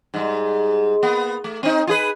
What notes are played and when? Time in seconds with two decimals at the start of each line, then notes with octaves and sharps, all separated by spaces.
0.14 G#2 G3
1.03 A#3 B3
1.44 A3
1.63 C4 D#4
1.87 F4 G#4 B4